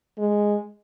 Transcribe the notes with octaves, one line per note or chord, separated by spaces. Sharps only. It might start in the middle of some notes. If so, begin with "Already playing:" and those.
G#3